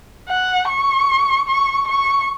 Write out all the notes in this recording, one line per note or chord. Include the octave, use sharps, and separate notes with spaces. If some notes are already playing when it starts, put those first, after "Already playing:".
F#5
C#6
C#6
C#6